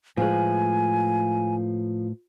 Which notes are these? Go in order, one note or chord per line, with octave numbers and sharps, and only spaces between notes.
A2 F3 G#3 A3 B4 G#5